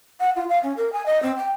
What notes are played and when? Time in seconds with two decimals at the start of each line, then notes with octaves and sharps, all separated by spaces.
0.20 F#5
0.36 F4
0.49 F5
0.63 C#4
0.77 A#4
0.92 G#5
1.06 D#5
1.22 C4
1.37 G5